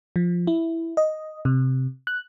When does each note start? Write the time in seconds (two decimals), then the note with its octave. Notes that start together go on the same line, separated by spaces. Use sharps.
0.16 F3
0.47 E4
0.97 D#5
1.45 C3
2.07 F#6